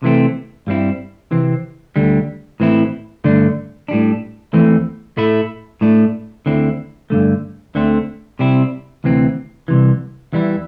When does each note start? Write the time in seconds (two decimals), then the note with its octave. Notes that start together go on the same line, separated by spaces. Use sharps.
0.03 C3 E3 A3 C4
0.67 G2 G3 C4 E4
1.31 C3 E3 C4
1.96 D2 D3 G3
2.60 A2 E3 C4 E4
3.24 G2 D3 A3 D4
3.88 A2 G3 D4
4.53 E2 E3 A3 C4
5.17 A2 A3 E4
5.81 A2 A3 D4
6.46 D2 D3 C4 E4
7.10 G2 D3 A3
7.75 D2 D3 A3 C4
8.39 C3 G3 C4 E4
9.04 D2 C3 E3 C4
9.68 C2 C3 E3
10.33 E2 E3 G3 E4